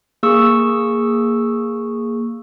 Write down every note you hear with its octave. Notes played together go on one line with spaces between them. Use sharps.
A#3 G#4 C#6 E6